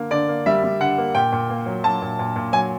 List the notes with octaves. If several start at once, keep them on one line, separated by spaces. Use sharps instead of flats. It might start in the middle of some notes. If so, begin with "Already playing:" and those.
Already playing: D3 A#3
D3 D5
A#3
G3 E5
G3
D3 F#5
A#3
A#2 G5
A#2
A#3
F#3
F#3 A5
A#2
A#2
A#2
F#3 G#5